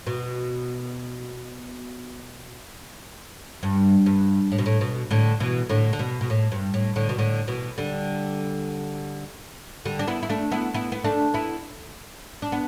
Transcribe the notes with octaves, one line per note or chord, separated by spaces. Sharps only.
B2
G2
G2
A2
B2
A2
B2
A2 D3
B2 E3
A2 D3
D3
B2
B2
A2
G2
A2
A2 D3
B2
A2 D3
B2 E3
D3 G3
D3 G3
D4
B3 E4
E4
A3 D4
B3 E4
B3 E4
B3
A3 D4
B3 E4
D4
B3